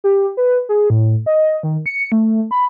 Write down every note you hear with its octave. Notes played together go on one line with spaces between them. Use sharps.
G4
B4
G#4
A2
D#5
D#3
C#7
A3
B5